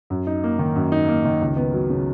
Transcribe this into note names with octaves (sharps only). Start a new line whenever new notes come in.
F#2
D#4
A#3
D#3
F#2
D#4
A#3
D#3
C#2
B3
F#3
C#3